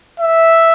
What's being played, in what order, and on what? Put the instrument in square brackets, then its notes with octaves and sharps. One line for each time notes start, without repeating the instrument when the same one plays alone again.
[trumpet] E5